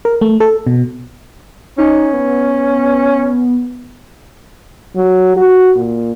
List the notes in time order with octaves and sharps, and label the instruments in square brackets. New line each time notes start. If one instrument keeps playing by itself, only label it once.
[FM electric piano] A#4
A3
A4
B2
[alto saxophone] C#4 [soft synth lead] D#4
[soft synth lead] B3
[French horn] F#3
F#4
A#2